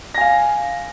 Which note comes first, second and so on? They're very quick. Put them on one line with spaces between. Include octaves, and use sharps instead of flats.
A#6 G#5 F5